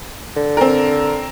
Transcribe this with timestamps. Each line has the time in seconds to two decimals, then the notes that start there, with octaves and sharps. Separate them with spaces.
0.37 D3
0.57 C4 A#4